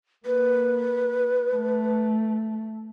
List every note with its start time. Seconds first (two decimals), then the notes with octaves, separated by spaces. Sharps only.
0.26 A#3 B4
1.55 A3